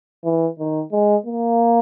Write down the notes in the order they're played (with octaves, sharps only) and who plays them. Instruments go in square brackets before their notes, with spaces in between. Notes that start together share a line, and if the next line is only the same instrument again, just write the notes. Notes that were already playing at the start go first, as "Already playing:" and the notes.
[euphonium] E3
D#3
G#3
A#3